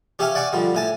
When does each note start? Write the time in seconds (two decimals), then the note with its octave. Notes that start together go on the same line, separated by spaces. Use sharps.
0.19 C#4 G4 C#5 E5 F5 G#5
0.35 D5 F#5 G#5 C#6
0.53 D3 F3 G3
0.75 A2 G#5 A5